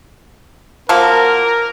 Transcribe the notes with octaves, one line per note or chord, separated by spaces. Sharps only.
F3 F#3 A#3 A#4